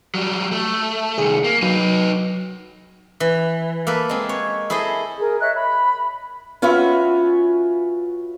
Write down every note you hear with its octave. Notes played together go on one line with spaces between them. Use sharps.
F#3 G3
A3
C2 D#3 G#4 C#7
A#3
F#3 D#4 B4
E3
A#3 A4 B4
G#3 C4
C#5
E4 G#4 A4 C5 D#5
G#4 A#4
C#5 D#5 E5 F#6
B5
C#4 F4 F#4 B4 E5